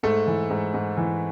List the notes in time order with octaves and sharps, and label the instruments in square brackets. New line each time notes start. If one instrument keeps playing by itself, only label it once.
[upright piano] G#2 [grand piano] A3 A4
[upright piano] E3
G#2
G#2
E3